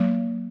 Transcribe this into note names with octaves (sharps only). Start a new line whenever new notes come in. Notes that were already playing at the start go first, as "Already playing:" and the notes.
Already playing: F#3 A#3